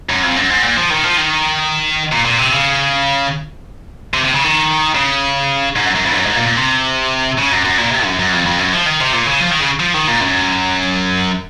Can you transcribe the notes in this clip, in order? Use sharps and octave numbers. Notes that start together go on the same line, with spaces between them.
F#2
F2
F#2
G#2
A#2
F3
D#3
F3
D#3
A#2
A#2
C3
C#3
C3
C3
C#3
D#3
C#3
G#2
F#2
F#2
F2
G#2
F#2
G#2
A#2
A#2
C3
C#3
F#2
F#2
A#2
C3
F#2
F#2
F2
F2
F#2
F3
D#3
C3
A#2
C#3
F3
D#3
C#3
F3
D#3
A#2
F#2